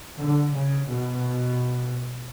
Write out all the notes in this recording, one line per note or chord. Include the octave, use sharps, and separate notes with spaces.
D3
C#3
B2